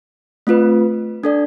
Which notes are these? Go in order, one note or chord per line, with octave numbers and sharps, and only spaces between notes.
A3 C4 F4 B4
D4 A4 D5